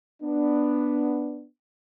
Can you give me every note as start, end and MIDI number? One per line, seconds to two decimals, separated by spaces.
0.23 1.45 59
0.23 1.45 62